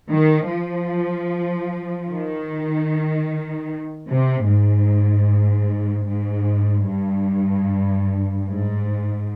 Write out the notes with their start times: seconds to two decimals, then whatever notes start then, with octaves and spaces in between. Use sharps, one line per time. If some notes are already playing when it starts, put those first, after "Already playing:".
0.09 D#3
0.49 F3
2.09 D#3
4.09 C3
4.48 G#2
6.08 G#2
6.88 G2
8.49 G#2